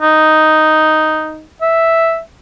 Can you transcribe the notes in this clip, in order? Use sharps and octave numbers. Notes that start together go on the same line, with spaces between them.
D#4
E5